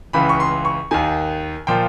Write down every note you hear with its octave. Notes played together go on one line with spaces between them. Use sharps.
C#2 C#3 E3 B5
C#6
C6
C#6
D#2 D#3 G#5
A#2 F3 G5